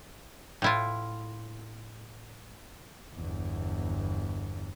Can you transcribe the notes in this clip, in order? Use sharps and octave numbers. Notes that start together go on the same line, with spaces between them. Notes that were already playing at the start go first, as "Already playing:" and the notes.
A2 E4 F4
G1 E2